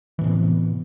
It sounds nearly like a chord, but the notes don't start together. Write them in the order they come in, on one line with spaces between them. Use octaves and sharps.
E3 A2 C3 B3